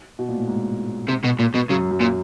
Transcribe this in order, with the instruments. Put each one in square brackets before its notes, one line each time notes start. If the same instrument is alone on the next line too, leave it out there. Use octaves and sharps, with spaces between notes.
[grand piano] B2
A#2
A2
G#2
[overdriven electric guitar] C3
B2
A#2
B2
[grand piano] F#2 [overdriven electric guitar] C#3
[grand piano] F#2
[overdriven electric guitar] A#2